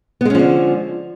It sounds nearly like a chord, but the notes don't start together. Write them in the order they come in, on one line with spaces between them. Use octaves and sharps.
B3 G#3 C#4 F3 D3